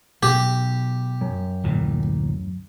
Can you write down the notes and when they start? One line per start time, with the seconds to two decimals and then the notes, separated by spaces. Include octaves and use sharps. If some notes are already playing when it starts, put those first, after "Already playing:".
0.23 B2 F#3 G4
1.21 F#2
1.64 D2 A#2 E3